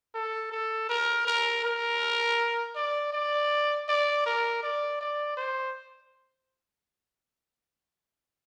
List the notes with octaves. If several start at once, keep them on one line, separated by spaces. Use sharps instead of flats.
A4
A4
A#4
A#4
A#4
D5
D5
D5
A#4
D5
D5
C5